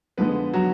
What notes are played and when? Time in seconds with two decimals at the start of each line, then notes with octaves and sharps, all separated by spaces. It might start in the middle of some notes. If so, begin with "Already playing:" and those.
0.17 F2 D3 F3 G#3 B3 B4
0.54 F#3 F#4